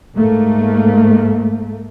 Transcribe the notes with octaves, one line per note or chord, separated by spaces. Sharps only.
G#2 A3 A#3